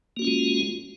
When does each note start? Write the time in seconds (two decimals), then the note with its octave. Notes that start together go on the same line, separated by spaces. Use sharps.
0.17 A#3
0.19 F#4
0.22 C#4
0.25 F4
0.27 G#3